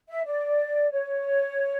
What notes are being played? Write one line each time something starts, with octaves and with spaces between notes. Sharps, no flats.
E5
D5
C#5